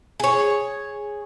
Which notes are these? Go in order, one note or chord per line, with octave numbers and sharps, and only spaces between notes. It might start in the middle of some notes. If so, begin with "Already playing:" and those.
G#4 C#5